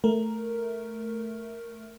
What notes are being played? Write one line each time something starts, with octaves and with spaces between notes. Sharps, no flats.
A3 A#4